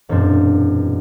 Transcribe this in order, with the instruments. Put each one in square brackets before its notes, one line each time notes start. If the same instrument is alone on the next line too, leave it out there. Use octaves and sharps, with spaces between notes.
[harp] E1 F#2 A#2 C4 D4 G6